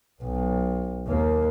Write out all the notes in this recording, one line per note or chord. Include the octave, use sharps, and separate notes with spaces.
B1
D#2 A#3